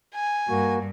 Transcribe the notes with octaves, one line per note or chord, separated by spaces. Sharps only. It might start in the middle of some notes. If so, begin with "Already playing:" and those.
G#5
G2 A#3 F#4